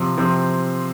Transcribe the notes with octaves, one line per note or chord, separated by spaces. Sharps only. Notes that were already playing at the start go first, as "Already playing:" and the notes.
Already playing: C3 F3
C3 F3 C4